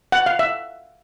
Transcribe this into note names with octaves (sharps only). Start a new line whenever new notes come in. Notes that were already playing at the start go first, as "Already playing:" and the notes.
F#5
F5
E5